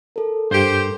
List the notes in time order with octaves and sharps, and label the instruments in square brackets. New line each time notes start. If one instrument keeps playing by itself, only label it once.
[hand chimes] A4 A#4
[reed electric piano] G2 G6 [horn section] G4 C5